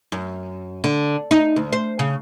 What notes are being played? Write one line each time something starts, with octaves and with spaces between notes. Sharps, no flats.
F#2
D3
D#4
D2
C5
C#3